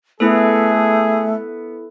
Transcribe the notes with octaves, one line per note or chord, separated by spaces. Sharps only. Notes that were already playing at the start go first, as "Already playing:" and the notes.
A3 B3 E4 G#4 A4